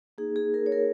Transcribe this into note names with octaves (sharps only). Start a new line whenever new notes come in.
A#3 D#4 G#4
G#4
A#4
C#5
A#4